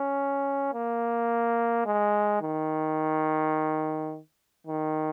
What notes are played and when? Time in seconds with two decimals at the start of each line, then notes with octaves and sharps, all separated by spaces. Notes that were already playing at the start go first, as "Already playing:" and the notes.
Already playing: C#4
0.73 A#3
1.86 G#3
2.42 D#3
4.67 D#3